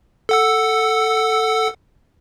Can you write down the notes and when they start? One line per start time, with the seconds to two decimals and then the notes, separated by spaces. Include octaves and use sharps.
0.29 A4 F#5 E6